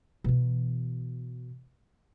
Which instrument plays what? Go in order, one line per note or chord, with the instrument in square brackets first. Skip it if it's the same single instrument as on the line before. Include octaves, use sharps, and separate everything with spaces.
[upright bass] B2 E3